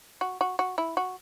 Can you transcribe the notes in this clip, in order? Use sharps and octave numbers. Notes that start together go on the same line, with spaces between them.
F#4
F#4
F#4
E4
F#4